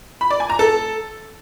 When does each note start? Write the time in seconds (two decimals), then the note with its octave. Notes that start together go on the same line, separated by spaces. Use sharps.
0.21 B5
0.31 D5
0.40 G#5
0.50 A#5
0.59 A4